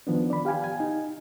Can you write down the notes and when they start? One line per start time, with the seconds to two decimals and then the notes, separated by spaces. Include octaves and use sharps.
0.07 D#3 F3 B3 D4
0.30 D5 B5
0.45 G4 F5 G5 G#5
0.64 G#5
0.80 D#4